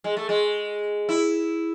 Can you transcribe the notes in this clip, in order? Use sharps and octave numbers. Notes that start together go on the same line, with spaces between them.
G#3
A3
G#3
E4